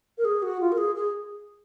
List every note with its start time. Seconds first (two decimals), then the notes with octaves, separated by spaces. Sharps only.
0.18 A#4
0.25 G#4
0.43 F#4
0.61 F4
0.72 A#4
0.78 G#4
0.96 G#4